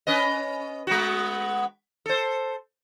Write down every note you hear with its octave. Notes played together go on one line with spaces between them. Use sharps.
C#4 B4 D#5
G#3 B3 F#4
A4 C5